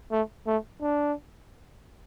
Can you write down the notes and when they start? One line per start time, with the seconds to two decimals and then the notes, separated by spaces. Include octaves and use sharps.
0.11 A3
0.47 A3
0.81 D4